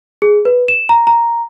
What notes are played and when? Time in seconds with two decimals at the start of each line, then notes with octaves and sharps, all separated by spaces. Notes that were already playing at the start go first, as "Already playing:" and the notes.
0.22 G#4
0.45 B4
0.68 E7
0.89 A#5
1.07 A#5